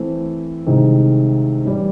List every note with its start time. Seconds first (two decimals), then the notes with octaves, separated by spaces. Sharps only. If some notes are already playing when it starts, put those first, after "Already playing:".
Already playing: E3 A3 C4
0.66 C2 C3 D#3 G#3
1.65 A2 E3 G3